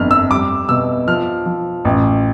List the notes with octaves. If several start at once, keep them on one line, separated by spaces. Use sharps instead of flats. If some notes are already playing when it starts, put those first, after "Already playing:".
Already playing: G1 F2 F6
E6
G3 D6
B2 E6
F3 F6
F3
A1